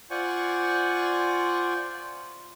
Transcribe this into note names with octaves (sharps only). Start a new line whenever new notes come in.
F4 C5 D5 F#5 G#5 C#6